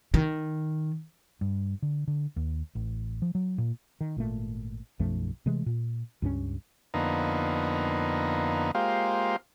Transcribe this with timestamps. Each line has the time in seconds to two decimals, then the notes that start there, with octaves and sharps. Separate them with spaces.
0.14 D#3
1.41 G2
1.82 D3
2.08 D3
2.36 D#2
2.75 A1
3.22 F3
3.35 F#3
3.58 A#2
4.01 D#3
4.16 G#1 A#2 A3
5.00 B1 F#2 F3 A3
5.46 C3 E3 G#3 A3
5.66 A#2
6.22 C#2 G2 F3 C#4
6.94 F2 D3 A#3 B3 D#4
8.75 G#3 A#3 F4 G4 C5 F5